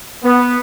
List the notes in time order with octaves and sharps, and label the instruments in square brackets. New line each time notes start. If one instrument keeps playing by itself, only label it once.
[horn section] B3